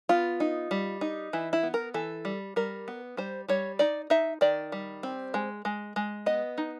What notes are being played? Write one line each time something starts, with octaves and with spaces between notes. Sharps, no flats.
B3 F4
D#4
G3
D#4
E3 E4
E4
B3
A#4
E3 A4
G3
G3 A#4
B3
G3 C5
G3 C#5
D#4 D5
D#4 E5
D#3 D5
G3
C4
G#3
G#3
G#3
B3 D#5
D#4